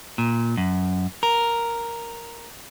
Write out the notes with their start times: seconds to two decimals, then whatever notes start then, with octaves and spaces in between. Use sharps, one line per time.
0.18 A#2
0.57 F#2
1.23 A#4